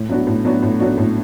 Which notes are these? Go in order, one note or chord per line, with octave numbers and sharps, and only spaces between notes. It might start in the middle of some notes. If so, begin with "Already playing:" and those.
Already playing: A2
F#3 B3 D4 F#4
A2
F#3 B3 D4 F#4
A2
F#3 B3 D4 F#4
A2